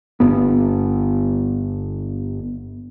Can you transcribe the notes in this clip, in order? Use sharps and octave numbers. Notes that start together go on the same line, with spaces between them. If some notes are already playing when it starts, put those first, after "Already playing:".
G1 B3